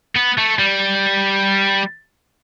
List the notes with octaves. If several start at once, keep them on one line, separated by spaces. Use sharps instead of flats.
B3
A3
G3